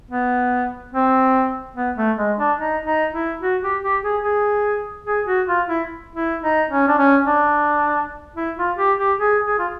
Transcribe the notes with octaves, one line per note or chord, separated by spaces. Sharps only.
B3
C4
B3
A3
G#3
D4
D#4
D#4
E4
F#4
G4
G4
G#4
G#4
G#4
F#4
F4
E4
E4
D#4
C#4
D4
C#4
D4
E4
F4
G4
G4
G#4
G#4
F4